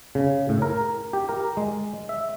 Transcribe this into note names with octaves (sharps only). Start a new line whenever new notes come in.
C#3
A2
A#4
G4
A#4
G#3
E5